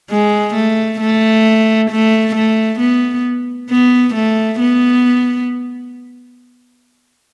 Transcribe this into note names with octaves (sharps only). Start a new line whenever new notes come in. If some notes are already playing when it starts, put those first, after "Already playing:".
G#3
A3
A3
A3
A3
B3
B3
A3
B3